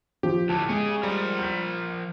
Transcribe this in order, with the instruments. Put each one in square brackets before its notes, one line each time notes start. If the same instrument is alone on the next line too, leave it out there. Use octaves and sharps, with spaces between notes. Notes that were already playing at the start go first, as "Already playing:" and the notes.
[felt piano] F3 [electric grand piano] G4
[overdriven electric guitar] D2 A2 [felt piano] A5
[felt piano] G#3 [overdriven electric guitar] C#4 G#4
[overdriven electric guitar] F3 A#4 [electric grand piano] G3
[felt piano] G6 B6